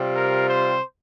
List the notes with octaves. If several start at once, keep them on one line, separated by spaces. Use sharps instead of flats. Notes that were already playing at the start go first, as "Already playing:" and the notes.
Already playing: C3 G3 C4 F4
A#4
C5